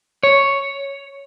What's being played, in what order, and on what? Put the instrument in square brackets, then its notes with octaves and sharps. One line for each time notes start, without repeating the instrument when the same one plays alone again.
[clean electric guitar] C#5